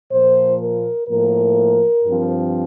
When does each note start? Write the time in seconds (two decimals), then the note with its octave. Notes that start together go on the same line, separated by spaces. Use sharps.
0.11 A#2 F3 A#3 C5
0.60 A#4
1.08 A2 F3 A#3 A#4
2.05 G2 F3 C4